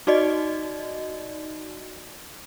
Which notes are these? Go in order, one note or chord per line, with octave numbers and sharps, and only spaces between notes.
D#4 F#4 D5 D#5